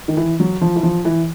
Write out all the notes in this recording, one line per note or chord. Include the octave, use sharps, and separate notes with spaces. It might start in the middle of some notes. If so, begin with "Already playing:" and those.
D#3
E3
F#3
F3
E3
F3
E3